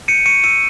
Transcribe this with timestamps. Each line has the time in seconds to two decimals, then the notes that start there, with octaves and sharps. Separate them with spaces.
0.08 G6 C#7 D#7
0.26 C#6 C#7 D#7
0.44 E6 C#7 D#7